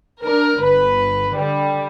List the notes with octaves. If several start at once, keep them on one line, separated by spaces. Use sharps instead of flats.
D4 A#4
G1 B4
D3 G3